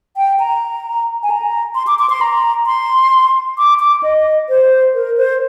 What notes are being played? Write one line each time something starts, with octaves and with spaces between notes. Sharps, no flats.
G5
A#5
G#5
A#5
C6
D6
D6
C6
A#5
C6
D6
D6
D#5
C5
A#4
C5